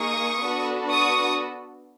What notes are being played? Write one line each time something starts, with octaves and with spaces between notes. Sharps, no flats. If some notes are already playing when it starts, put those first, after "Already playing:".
Already playing: A#3 D#4 G#4 C#6 D#6
B3 D4 F#4 A4
C#6 D#6